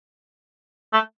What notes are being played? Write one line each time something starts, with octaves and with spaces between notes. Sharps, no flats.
A3